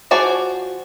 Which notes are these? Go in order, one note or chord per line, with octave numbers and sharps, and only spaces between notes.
F3 F#4 G#4 D5